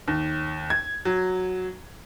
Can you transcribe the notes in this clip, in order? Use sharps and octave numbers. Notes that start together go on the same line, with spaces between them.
D#2
G#6
F#3